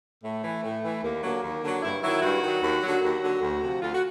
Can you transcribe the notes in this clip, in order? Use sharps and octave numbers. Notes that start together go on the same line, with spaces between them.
A2 A3
E3
A2
E3
D#2 A#3
D3 F#3 A#3
D#2
D3 F#3
G2 E4
D#3 F#3 E4
G2 F#4
D#3 F#3
D#2
D3 F#3
D#2 F#4
D3 F#3
D2
C3 F3
D2 F4
F#4